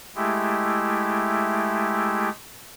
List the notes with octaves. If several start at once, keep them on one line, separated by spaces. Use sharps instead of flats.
G#3 A3 E4 G4